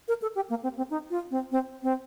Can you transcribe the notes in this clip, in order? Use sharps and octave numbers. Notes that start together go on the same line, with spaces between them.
A#4
A4
G4
A#3
C4
C4
D#4
F4
C4
C4
C4